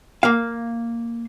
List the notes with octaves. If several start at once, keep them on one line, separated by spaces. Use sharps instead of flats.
A#3 F5